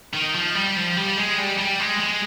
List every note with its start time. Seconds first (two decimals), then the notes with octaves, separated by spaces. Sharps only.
0.14 D#3
0.35 F3
0.55 G3
0.76 F3
0.97 G3
1.17 G#3
1.38 G3
1.58 G3
1.80 G#3
2.00 G#3